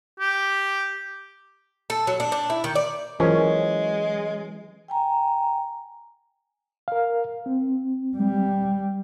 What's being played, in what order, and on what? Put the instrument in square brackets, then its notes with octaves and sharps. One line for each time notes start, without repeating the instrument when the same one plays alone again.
[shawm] G4
[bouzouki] A4
F#3
D4
D4
E4
D#3
D5
[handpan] E3 F#3 [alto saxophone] G#3 [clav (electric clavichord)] C#4 [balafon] F4 A#4 C5
[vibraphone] G5 G#5 A#5
[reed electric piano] A#4 F5
C4
[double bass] G3